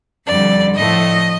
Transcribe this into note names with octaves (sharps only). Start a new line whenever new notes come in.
F2 D3 G3 D5
A2 F3 A3 D#5